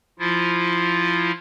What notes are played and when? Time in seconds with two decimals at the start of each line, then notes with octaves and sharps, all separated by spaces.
0.19 F3 E4 F4